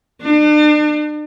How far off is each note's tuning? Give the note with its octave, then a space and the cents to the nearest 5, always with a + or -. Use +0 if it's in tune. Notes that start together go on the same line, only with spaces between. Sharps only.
D4 +40